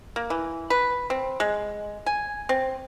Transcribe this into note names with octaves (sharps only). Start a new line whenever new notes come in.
A#3
E3
B4
C4
G#3
G#5
C4